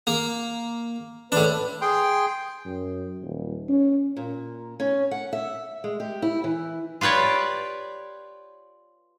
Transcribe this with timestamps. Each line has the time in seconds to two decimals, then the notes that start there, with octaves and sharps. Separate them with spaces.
0.07 A#3
1.32 A2 D4 B4
1.81 G#4 G5 C6
2.65 F#2
3.22 D#1
3.68 C#4
4.17 A#2
4.80 C#4
5.11 F#5
5.33 E5
5.84 G#3
6.00 G4
6.22 E4
6.44 E3
7.01 F4 G4 B4 C#5 D5